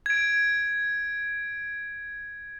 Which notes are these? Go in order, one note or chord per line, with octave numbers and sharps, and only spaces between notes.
G#6 D7